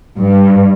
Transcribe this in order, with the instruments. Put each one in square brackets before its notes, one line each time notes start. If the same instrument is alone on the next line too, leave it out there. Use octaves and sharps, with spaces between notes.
[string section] G2